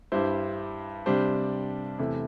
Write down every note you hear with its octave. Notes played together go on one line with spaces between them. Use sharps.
G2 G3 E4 C5
C3 G3 D4 C5
E2 C3 A3 E4